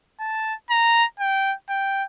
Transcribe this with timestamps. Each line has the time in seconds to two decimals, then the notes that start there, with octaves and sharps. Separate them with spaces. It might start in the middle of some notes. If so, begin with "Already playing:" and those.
0.20 A5
0.70 A#5
1.20 G5
1.69 G5